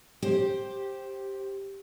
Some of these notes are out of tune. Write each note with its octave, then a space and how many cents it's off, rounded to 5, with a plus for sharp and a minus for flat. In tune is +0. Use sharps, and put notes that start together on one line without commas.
G4 +0 C5 +10